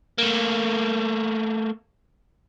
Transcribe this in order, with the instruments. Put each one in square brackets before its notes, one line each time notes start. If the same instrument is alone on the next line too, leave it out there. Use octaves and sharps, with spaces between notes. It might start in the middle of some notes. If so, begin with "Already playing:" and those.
[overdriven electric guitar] A3 A#3